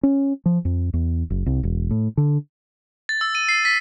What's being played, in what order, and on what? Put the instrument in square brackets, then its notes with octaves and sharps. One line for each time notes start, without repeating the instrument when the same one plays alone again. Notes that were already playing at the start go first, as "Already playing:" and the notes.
[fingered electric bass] C#4
F3
F2
E2
F#1
C2
E1
A2
D3
[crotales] A6
E6
D#7
C7
B6